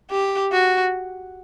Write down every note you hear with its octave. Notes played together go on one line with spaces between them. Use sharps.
G4
F#4